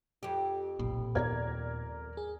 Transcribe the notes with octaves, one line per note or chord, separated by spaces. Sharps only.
F2 G4
F#1 B1 A#2
D#2 G#2 B3 A#4 D5 G#6
G#4